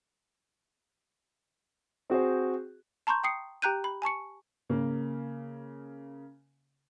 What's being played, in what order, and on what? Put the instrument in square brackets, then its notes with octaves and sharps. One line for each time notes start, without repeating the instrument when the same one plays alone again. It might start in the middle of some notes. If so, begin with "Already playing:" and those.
[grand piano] C4 F#4 G#4 C5
[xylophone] A5 A#5 C6 C#6 G6
G5 D#6 C7 C#7
G4 G5 A#5 F#6 G6 D#7
B5
G#5 A5 C#6 C#7
[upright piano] C#3 A#3